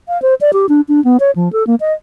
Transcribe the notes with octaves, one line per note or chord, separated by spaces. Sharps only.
F5
C5
D5
G4
D4
D4
B3
C#5
F3
A4
A#3
D#5